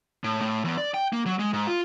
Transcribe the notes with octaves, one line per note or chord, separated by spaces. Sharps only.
A2
A2
E2
D5
G5
A#3
F#3
G#3
G#2
F4